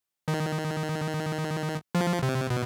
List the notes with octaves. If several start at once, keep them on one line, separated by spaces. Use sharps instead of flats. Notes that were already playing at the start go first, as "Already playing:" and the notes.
D#3
F3
C3
B2